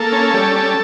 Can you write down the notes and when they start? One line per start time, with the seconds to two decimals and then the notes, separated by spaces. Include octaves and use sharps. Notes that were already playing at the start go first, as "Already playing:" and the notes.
Already playing: A#3 A4
0.12 C#4
0.34 G3
0.56 C#4